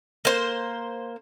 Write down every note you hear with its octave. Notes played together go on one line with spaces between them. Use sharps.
A#3 C5